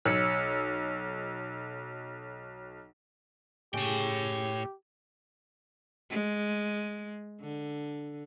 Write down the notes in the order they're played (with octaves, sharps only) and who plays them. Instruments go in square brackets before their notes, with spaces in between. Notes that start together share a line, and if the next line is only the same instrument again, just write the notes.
[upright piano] B1 [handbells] C#5 E6 C#7
[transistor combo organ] A2 [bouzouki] C#3 [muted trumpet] G4 [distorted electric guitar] C#5 G5
[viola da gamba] G#3
D3